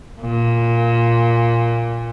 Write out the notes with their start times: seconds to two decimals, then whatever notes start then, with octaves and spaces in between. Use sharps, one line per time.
0.21 A#2